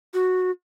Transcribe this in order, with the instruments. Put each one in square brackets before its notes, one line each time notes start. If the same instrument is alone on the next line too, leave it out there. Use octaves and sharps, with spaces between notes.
[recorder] F#4